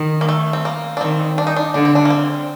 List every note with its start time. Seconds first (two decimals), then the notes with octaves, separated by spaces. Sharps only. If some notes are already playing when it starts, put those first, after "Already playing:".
Already playing: D#3
0.21 A#3
0.29 A3
0.53 C4
0.65 A#3
0.97 D4
1.01 D#3 C4
1.38 D4
1.47 D#4
1.56 D4
1.74 D3 D4
1.85 C4
1.95 D4
2.05 A#3
2.10 C4